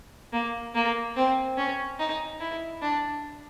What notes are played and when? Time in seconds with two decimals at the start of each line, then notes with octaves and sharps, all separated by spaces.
0.33 A#3
0.75 A#3
1.16 C4
1.58 C#4
1.99 D#4
2.41 E4
2.82 D4